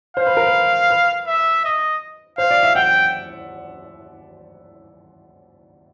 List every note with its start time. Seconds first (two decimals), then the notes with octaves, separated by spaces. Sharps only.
0.17 C5 F5
0.27 B4
0.37 A#4
0.46 B4
0.90 B4
1.27 E5
1.65 D#5
2.38 C5 F5
2.51 D5
2.63 E5
2.75 F#5 G5